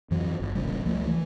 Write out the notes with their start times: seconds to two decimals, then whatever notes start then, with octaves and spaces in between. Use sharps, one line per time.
0.11 F2 E3 F#3
0.40 G1
0.55 D#1 A1 C#3 G3
0.84 C#2 F3 G3 A3
1.07 E3